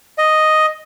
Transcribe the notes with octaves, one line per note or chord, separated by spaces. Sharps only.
D#5